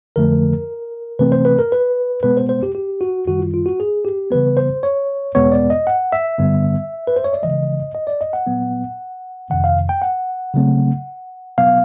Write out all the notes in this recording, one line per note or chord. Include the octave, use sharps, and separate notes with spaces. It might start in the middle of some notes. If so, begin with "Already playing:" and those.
F2 D3 F3 A3 A#4
C3 E3 A3 C4 B4
C5
B4
A#4
B4
B2 G#3 B3 B4
C5
C5
G4
G4
F#4
F#2 D#3 G3 F#4
F4
F4
F#4
G#4
G4
C#3 E3 G3 B3 B4
C5
C#5
E2 B2 G#3 B3 C#5
D5
D#5
F#5
E5
G2 D3 G3 B3
B4
C5
C#5
D5
C#3 E3 G#3 D#5
D#5
D5
D#5
F#5
A#2 F#3 B3
F2 C3 D#3 F#5
F5
G5
F#5
C#3 F#3 A3 C4
B2 F#3 B3 F5